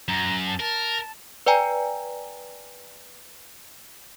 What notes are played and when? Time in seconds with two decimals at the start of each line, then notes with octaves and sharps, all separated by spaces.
0.08 F#2 A#5
0.47 A5
0.60 A#4 A5
1.46 B4 D5 G5 G#5 A#5